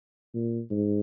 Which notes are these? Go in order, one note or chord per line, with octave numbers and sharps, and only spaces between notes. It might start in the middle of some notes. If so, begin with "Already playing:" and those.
A#2
G#2